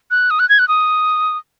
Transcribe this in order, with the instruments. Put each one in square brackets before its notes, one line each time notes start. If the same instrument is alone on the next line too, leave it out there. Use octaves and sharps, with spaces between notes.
[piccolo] F#6
D#6
F#6
G#6
F#6
D#6